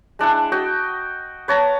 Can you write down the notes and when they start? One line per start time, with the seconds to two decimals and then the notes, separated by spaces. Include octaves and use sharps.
0.19 G#3 D4 E4 F#5
0.52 F#4 D#5 G5
1.48 B4 C#5 A5 A#5